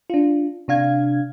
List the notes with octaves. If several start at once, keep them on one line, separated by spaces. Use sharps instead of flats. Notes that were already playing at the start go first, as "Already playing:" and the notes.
D4 F4
C3 D4 F5 G#6